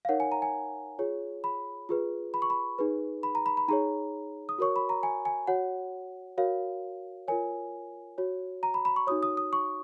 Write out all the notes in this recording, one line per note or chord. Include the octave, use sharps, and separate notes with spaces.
F5
D#4 A#4 C#5 F#5
G#5
A#5
G#5
F4 G#4 C#5
B5
F4 G#4 B4
B5
C#6
B5
D#4 G#4 B4
B5
A#5
B5
B5
D#4 G#4 C#5 A#5
D#6
F#4 A#4 C#5 C#6
B5
A#5
G#5
G#5
F#4 C#5 F#5
F#4 A#4 C#5 F5
F4 A#4 C#5 G#5
F#4 C#5
A#5
B5
B5
C#6
D#4 F#4 C#5 D#6
D#6
D#6
C#6